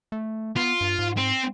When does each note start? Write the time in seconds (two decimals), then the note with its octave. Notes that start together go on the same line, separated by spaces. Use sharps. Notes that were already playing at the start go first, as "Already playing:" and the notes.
0.12 A3
0.56 B3 F4
0.81 G2
0.99 G#2
1.17 C4